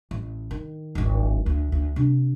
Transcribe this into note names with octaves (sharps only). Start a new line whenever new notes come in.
A1
D#3
D1 G#1
D2
D2
C3 D4